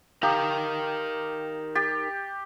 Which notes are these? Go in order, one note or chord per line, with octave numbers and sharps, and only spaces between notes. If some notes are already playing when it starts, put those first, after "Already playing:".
D#4 G4 A#4 F5 G5 A#5 D#6
G4 A6